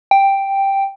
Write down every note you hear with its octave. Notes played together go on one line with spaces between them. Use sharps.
G5